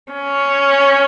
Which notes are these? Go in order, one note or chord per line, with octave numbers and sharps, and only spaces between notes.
C#4